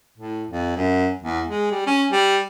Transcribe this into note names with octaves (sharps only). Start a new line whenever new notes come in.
A2
F2
F#2
E2
G#3
G3
C#4
G3